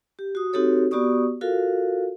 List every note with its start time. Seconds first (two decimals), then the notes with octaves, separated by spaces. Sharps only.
0.19 G4
0.35 F#4 D#6
0.53 C4 D#4 F#4 G4 A4 C#5
0.91 B3 F#4 G4 D5 C#6 D#6
1.41 F4 F#4 A4 A#4 F5